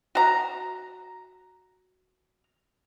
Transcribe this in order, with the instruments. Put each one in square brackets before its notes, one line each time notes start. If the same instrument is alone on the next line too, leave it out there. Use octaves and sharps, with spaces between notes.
[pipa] F#4 A#5